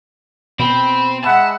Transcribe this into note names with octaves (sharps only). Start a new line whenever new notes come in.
B2 C4 B5
G#3 E5 F#5 A5 B5